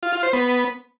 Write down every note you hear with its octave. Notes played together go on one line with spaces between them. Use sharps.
F4
F4
C5
B3